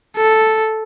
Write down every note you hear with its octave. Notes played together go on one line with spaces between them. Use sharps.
A4